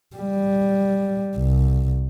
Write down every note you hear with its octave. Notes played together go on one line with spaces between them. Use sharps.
G3
C2